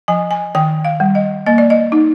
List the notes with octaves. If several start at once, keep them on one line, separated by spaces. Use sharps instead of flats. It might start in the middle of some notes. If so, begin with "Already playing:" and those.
F3 G#5
G#5
D#3 G5
F5
G3
D#5
A#3 D#5
D5
D#5
D#4